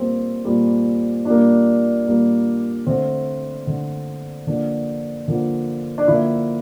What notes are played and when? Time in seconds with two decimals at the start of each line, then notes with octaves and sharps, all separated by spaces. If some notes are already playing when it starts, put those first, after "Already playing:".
Already playing: A#2 G3 A#3 C4
0.45 A#2 G3 A#3
1.25 A#2 G3 A#3 D4
2.06 A#2 G3 A#3
2.86 D3 A3 C4
3.67 D3 A3
4.47 D3 F3 A#3 D4
5.28 D3 F3 A#3
5.98 D4
6.08 D3 F3 A#3 E4